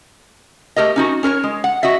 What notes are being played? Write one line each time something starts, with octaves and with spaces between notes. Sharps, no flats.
A3 G4 A#4 D#5
C#4 D#4 F#4
C#4 A#4 B4 C#5
G#3
F#5
F#4 D#5 E5